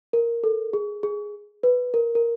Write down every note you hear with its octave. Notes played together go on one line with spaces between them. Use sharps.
A#4
A4
G#4
G#4
B4
A#4
A#4